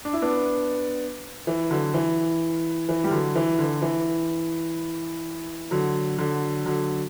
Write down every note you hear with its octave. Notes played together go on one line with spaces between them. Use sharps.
D4
E4
B3 D4
E3
D3 F#3
E3
E3
G3
D3 F#3
E3
D3
E3
D3 F#3
D3 F#3
D3 F#3